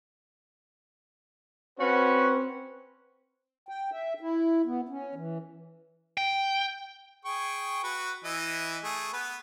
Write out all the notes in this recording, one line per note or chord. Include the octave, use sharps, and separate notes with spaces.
C4 C#4 F#4 B4
G5
E5
E4
B3
C#4
E3
G5
G#4 G5 C#6
F#4 B4
E3 E4 D#5
A3 G#4
B3 B4